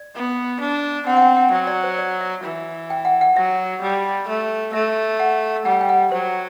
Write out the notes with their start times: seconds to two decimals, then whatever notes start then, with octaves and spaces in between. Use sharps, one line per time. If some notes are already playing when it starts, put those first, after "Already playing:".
Already playing: D5
0.15 B3
0.61 D4
1.07 C4 F#5
1.17 F#5
1.22 G5
1.37 F#5
1.52 F#3 E5
1.67 D5
1.83 C5
1.98 D5
2.21 E5
2.44 E3
2.90 G5
3.05 F#5
3.21 F#5
3.36 F#3 E5
3.82 G3
4.28 A3
4.73 A3 E5
5.19 F#5
5.65 G3 F#5
5.81 G5
5.89 F#5
6.12 F#3 C5